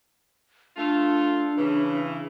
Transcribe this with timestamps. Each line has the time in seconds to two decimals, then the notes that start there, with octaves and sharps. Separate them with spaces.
0.77 A3 D4 F4
1.56 C#3 E3